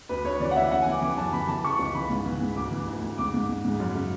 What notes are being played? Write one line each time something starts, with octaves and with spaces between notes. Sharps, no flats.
D2 B4
D2 C#5
E3 D5
F#5
E3 E5
E3 F#5
G#5
E3 D6
E3 D6
F#2 A5
E3 B5
E3 A5
C#3 C#6
C#2
E3 B5
G#2
E3
G#2
D2 D6
E3
D2
D2
G#2 D6
G#2
G#2
G#2
F#2
C#3